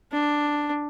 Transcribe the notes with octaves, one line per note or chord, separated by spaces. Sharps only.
D4